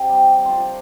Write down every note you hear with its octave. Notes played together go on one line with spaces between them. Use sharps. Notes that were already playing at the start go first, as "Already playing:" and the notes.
Already playing: C3 D#5
G3
G3
F3 C5 D5